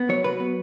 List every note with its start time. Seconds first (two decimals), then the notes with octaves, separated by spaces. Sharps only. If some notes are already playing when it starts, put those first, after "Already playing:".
Already playing: B3
0.09 F#3 C#5
0.24 F#3 B4
0.40 B3